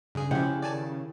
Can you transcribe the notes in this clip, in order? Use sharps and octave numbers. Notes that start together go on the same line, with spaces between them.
G2 C#3 G#4
C3 F3 C#4 E4 G4 F#5
D#3 D5 G#5 A5